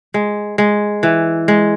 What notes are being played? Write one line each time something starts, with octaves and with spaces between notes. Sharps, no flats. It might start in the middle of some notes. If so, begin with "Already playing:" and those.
G#3
G#3
E3
G#3